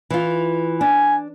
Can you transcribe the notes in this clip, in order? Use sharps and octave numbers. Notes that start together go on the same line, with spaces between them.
E3 F4
D4 G#5